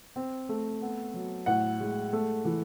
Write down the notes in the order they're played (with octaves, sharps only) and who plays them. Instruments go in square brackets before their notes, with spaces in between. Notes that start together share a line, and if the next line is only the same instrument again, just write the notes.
[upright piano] C4
A3
B3
F#3
A2 F#5
G#3
A3
E3